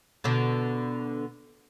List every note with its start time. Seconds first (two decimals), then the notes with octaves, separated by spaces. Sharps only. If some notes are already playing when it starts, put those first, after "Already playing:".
0.24 B2 D3 D4